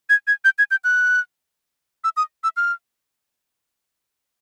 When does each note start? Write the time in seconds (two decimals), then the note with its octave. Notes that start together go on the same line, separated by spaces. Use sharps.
0.10 G#6
0.27 G#6
0.45 G6
0.58 G#6
0.71 G6
0.84 F#6
2.04 E6
2.17 D#6
2.44 E6
2.57 F6